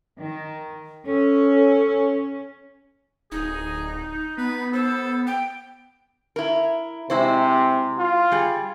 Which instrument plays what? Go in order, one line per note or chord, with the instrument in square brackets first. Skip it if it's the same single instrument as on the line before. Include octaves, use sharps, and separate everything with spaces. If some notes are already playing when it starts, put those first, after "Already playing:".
[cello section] D#3
[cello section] C#4 [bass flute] A4
[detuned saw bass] D1 [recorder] D#4 [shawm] G#4
[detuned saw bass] B3 [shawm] B4
[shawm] A4 [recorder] C5
[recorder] G5
[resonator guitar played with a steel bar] E4 A#4
[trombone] C3 [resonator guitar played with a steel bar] G#3 E4 C5
[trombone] F4
[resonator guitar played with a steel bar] G3 G#4